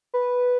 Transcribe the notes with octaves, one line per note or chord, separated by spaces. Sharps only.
B4